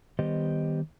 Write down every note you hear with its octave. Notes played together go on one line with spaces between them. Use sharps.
D#3 G3 B3 G4 C5 D#5